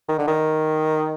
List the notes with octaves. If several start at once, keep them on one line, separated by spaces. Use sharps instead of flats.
D#3
D3
D#3